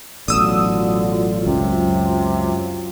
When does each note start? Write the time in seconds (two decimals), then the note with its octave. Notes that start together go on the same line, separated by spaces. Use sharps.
0.28 A1 B2 D3 F#3 F4 D#6 E6
1.47 C#2 F#2 C3